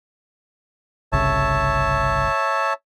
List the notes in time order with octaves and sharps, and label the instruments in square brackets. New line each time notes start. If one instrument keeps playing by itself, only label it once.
[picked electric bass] G1 C2 C#3 [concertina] C#5 E5 A5